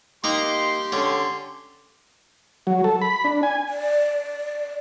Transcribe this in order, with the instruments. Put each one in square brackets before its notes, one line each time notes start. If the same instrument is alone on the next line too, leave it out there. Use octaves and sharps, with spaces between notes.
[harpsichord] A#3 D#4 A#5 [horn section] G4 C6
[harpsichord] D3 C#4
[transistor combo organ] F#3
A4
B5
D4
G#5
[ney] D5